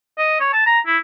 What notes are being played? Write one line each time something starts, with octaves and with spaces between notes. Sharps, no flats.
D#5
C#5
A5
A#5
E4